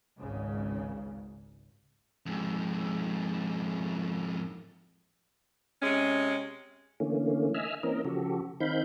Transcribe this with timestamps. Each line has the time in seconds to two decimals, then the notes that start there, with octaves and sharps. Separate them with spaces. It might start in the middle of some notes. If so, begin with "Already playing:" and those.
0.19 G#1 C#2 G#2 C#3
2.26 F2 G#2
5.82 C3 G#3 C#4
7.00 D3 E3 A3 A#3 C#4
7.54 D#5 E5 G#5 E6 F6
7.83 E3 A#3 C4 C#4 A#4 D#5
8.05 C#3 F3 F#4 G4 A4
8.60 D#3 C4 D#4 F5 B5 G6